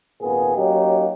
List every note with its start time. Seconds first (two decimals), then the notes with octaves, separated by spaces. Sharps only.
0.21 G#1 A#2 B3 G#4
0.56 F#3 A#3 C#4 D#4 G4